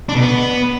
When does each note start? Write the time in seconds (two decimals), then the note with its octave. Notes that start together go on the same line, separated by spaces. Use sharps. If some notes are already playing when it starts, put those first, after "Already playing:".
0.09 D4
0.15 B2
0.20 B3